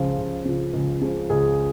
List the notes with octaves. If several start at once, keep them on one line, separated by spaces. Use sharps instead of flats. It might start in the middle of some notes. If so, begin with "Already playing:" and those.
Already playing: C#2 C#3 F3 F4
C#2
C#3 F3
C#2
C#3 F3
C#2 G#4